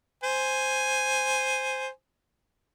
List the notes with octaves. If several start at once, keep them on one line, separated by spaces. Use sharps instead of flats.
C5 G#5